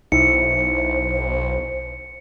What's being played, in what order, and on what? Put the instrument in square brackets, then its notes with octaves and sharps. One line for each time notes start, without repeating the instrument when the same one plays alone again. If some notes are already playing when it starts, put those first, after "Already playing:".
[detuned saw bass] B1 [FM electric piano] D#4 E4 E5 [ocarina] C5 [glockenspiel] C#7